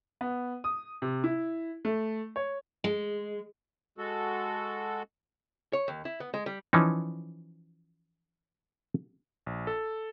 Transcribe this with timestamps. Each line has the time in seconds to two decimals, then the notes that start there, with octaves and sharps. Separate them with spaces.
0.21 B3
0.64 D#6
1.02 C3
1.24 E4
1.85 A3
2.36 C#5
2.84 G#3
3.98 G#3 F#4 A4
5.73 C#5
5.88 D#2
6.05 E4
6.20 B3
6.34 G#3
6.46 G3
6.73 E3 F3 C#4 D#4
9.46 A#1
9.67 A4